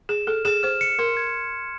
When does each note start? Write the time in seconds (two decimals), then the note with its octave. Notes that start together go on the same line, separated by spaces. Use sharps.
0.09 G#4 E7
0.27 A4 F6
0.45 G#4 E7
0.63 C5 F6
0.81 C#7
0.99 A#4 C6
1.17 G#6